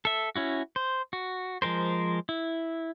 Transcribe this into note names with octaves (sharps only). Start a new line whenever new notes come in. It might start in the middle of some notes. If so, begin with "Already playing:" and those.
A4 E5
C#4 E4 F#4
C5
F#4
F3 G#3 A#4 C5
E4